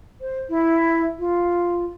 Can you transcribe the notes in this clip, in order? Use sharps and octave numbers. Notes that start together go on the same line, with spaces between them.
C5
E4
F4